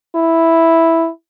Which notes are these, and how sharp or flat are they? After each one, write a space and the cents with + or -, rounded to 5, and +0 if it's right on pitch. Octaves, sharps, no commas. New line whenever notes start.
E4 +0